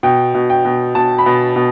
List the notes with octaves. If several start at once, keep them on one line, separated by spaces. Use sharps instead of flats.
B2 G5
B2
G5
B2
B2 A5
B5
B2
B2